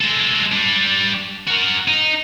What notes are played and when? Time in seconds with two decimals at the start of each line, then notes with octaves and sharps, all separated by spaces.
0.01 G#3 A4
0.52 G3 D4
1.48 F#4 A#4
1.88 D#4